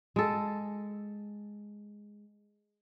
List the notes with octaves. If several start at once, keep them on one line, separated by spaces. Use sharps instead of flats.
G#3 A4